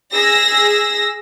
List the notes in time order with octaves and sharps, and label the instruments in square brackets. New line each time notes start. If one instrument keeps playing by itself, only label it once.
[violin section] G#4 E6 A#6